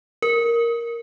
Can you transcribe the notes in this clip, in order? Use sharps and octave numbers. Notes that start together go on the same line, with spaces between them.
A#4